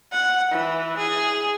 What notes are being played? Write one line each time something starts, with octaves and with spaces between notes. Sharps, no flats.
F#5
E3
G#4